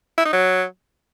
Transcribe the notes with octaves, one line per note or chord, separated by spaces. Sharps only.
E4
D#4
F#3